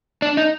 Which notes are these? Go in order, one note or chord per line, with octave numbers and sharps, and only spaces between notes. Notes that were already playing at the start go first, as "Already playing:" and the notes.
D4
D#4